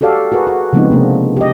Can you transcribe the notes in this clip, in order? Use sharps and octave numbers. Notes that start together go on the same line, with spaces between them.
F#4 G4 A4 D5 F5
F#4 G#4 A#4 B4
F#4
C#3 F3 G#3 B3 C4 D#4
C3 A#3 D4
G4 D#5